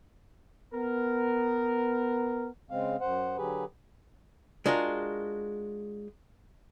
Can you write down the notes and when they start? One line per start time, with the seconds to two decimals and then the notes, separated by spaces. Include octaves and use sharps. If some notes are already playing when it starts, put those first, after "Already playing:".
0.74 B3 A#4
2.70 C#3 G#3 C4 F5
3.00 F#2 C5 F#5
3.37 D3 F#3 G4 G#4 B4
4.66 G#3 D4 F4 F#4 A#4